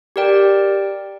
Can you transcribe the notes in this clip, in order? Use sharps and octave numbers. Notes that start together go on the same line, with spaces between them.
G4 A#4 D5 G5